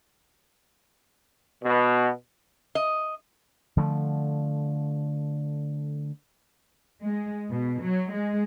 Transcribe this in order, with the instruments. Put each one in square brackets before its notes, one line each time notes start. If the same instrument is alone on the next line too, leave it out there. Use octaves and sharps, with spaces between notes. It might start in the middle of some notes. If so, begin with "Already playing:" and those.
[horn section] B2
[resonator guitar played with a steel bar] D#5
[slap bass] D3 F3 A3
[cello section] G#3
B2
F#3
G#3